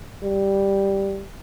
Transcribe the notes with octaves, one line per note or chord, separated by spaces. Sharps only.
G3